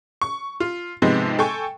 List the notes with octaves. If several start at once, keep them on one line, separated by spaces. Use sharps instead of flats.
C#6
F4
G#2 C3 F3 G#3 B3 C4
A4 G5 G#5 C#6